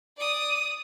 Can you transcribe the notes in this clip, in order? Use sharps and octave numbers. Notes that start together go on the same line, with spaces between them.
D5 D#6